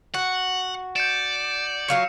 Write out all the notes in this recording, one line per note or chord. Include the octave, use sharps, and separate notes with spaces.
F#4 F#5
D5 G6 C#7 E7
F#3 F4 C#5 C#7